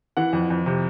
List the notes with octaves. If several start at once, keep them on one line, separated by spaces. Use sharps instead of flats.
E3 F#5
F2
F2
C3